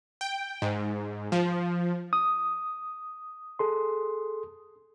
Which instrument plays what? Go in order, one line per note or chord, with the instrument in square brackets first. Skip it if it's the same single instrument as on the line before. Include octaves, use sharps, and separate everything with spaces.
[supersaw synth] G5
G#2
F3
[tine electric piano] D#6
[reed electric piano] G#4 A4 C6